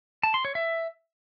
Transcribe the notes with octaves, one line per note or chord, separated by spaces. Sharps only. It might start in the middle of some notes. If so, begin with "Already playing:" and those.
A5
C6
C#5
E5